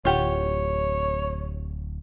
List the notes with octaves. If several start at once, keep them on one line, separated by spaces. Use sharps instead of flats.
D1 F4 G4 C#5 F#5